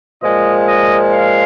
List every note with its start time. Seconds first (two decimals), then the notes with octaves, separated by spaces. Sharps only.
0.21 A#2 F3 G#3 D#5
0.67 D#5
1.12 F5